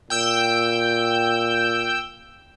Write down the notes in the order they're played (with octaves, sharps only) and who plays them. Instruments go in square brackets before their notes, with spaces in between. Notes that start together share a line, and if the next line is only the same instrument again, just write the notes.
[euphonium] A#2 [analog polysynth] G5 E6 G6